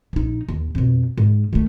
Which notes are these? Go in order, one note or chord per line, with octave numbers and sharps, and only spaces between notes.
A#1 D#4
D#2
F2 B2
G#2
D#3 A3